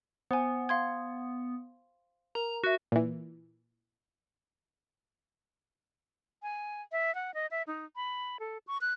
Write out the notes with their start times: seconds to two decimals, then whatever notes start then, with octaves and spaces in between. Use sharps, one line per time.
0.31 B3 C5 G#5
0.69 F5 C6 G#6
2.35 A#4 A#5
2.64 F#4 E5 F#6
2.92 A#2 E3
6.43 G#5
6.92 E5
7.15 F#5
7.34 D#5
7.51 E5
7.67 D#4
7.96 B5
8.40 A4
8.67 C#6
8.81 F#6